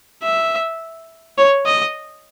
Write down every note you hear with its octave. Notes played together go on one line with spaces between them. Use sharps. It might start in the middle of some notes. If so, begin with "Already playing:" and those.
E5
C#5
D#5